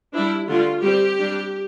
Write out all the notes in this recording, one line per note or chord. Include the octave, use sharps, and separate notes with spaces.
G3 D4 E4
D3 A3 D4 F4
G3 C4 G4
G3 D4